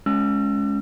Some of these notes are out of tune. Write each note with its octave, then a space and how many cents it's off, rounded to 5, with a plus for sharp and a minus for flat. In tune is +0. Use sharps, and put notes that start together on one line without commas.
G#3 +10 C#4 +5 E6 +40